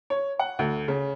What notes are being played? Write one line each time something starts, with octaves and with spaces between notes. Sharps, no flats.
C#5
F#5
D2
C#3